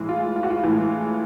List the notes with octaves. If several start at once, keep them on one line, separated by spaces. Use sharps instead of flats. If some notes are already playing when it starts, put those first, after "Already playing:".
Already playing: A2 E3 G#3
F4
F4
F#4
F4
A2 E3 G#3